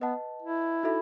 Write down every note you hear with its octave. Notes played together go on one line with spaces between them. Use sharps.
B3 B4 D#5 F#5 A5
E4
D#4 F#4 A4 E5 B5